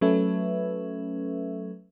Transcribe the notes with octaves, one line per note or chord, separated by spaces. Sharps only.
F#3 A3 C#4 A4 B4 E5